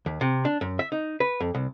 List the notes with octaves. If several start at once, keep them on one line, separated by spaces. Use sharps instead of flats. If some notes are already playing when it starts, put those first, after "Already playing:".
D#2
C3
D4
F#2
E5
D#4
B4
F2
C2